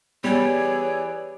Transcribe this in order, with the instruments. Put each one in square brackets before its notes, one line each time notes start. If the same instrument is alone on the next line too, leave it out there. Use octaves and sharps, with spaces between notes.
[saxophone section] E3 G#4 D5 [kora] G3 [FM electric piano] B3 [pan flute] C#5